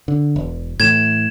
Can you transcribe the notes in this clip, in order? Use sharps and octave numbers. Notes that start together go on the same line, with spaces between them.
D3
E1
A2 E3 G#6 E7